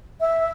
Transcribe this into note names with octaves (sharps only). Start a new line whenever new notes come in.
E5